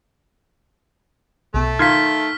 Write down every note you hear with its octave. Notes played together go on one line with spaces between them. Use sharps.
B1 B2 A3
D#3 F5 C6 F6 G#6 B6